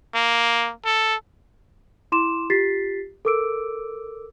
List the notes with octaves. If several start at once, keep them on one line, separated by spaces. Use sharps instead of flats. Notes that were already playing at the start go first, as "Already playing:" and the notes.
A#3
A4
E4 C6 D6 E7
F4 G4 A6 B6 C7
A4 A#4 D6 E6 D7